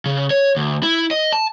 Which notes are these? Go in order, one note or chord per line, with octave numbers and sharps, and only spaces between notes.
C#3
C#5
D2
E4
D#5
A5